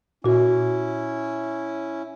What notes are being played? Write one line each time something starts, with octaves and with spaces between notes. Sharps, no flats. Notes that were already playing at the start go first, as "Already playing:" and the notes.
A#2 C#4 E4 F#4